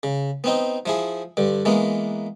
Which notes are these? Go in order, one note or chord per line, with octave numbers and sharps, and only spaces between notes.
C#3
B3 C4 D#4
F3 E4 G#4
G2 D3
E3 G#3 A#3 B3